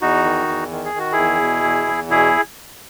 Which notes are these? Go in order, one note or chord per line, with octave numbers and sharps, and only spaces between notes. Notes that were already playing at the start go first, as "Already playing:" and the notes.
E2 D#4 F#4
D#3
E2
D#3
G#4
D#3 F#4
E4 G#4
E2
B2
E2
E2
B2 E4 G#4